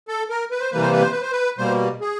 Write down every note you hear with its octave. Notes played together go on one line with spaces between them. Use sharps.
A4
A#4
B4
C5
C3 E3 G3 A#3 B4
C5
B4
C5
B4
C5
B4
B2 G3 A#3 C5
G#4